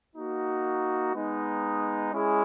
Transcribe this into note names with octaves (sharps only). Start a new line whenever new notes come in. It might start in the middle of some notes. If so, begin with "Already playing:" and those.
A#3 D#4 F#4
G#3 B3 D#4
G#3 C#4 E4 G#4